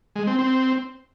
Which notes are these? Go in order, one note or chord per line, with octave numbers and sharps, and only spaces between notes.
G#3
C4
C4